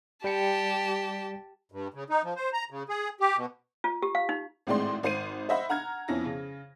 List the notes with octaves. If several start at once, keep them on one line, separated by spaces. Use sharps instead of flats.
G3 G4 G5 A5 C#7
G2
C#3
D#4
F3
C5
A#5
C#3
G#4
G4
B2
F4
G4
F5
D#4
G#1 A2 G#3 C4 D5 C6
G#1 C5 C7 D#7
C5 D#5 E5 F#5 B5
F#5 A#5 F6 G#6
F2 B3 C#4 E4 A#6
C#3